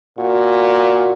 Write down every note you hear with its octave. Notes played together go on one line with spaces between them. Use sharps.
A#2 F#4